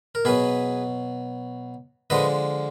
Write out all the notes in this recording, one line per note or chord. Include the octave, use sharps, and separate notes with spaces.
A#4
B2 F#3 G#4 B4
D3 F3 G#3 B4 D#5